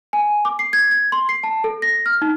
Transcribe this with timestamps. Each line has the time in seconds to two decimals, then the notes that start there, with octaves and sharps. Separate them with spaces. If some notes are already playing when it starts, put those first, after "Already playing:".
0.13 G#5
0.45 D6
0.59 C7
0.73 G#6
0.91 G#6
1.12 C6
1.29 C7
1.43 A5
1.64 A4
1.82 A#6
2.06 F6
2.22 D#4